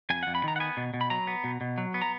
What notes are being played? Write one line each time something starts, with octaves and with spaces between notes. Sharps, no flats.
F2 G#5
F2 F#5
B5
D#3 A#5
F#5
B3 G#5
B2
B2
B5
F#3 A#5
B3
B2
B2
F#3
B3
A#5